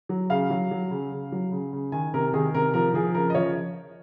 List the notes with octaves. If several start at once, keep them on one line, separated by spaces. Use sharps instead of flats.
F#3
C#3 F5
F#3
F#3
C#3
C#3
F#3
C#3
C#3
D#3 G#5
C3 A#4
D#3 G#4
C3 A#4
F3 A#4
F3 G#4
C#3 A#4
D#5
F3 C#5